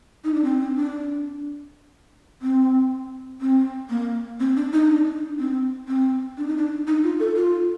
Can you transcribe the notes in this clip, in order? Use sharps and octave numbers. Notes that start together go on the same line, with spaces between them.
D#4
D4
C4
C4
D4
C4
C4
A#3
C4
D4
D#4
D4
C4
C4
D4
D#4
D4
D#4
F4
A4
F4